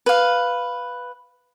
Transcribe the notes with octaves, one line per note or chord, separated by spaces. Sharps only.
B4 F5